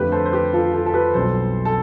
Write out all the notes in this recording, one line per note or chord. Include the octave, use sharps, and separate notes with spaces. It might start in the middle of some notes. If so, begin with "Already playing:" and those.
Already playing: F2 D3 A3 C4 G4 B4
A4 C5
C5
G4 B4
F4 A4
F4 A4
A4
G4 B4
B1 B2 G3 C4 A4 C5
A4